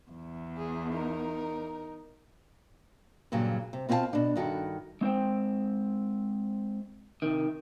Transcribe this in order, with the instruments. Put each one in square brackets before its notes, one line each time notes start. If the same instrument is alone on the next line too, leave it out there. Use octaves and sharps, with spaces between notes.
[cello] E2
[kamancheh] G#4
D#4 A#4
[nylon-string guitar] G2 A#2 C#3 F#3
C3
B2 C4 F4 E5 F5 A5
B2 D4
G2 D#3 F#4 A4
[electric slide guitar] G#3 C4 C5 G5
C3 D#3